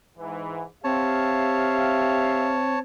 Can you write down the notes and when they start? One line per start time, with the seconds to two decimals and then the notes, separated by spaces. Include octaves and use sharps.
0.18 G#2 E3
0.84 C4 G4 C#5 E5 F5 A5